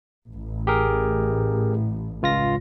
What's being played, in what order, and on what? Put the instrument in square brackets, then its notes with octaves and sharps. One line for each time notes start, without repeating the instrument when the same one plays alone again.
[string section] A1
[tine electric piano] G4 G#4 A#4
C#2 F4 A#6